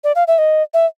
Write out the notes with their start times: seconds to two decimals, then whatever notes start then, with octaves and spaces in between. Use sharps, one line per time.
0.04 D5
0.15 F5
0.28 E5
0.38 D#5
0.74 E5